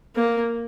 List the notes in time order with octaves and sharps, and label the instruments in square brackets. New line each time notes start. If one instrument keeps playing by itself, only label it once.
[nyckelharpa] A#3